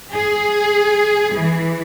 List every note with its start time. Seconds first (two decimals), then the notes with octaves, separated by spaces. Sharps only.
0.14 G#4
1.35 E3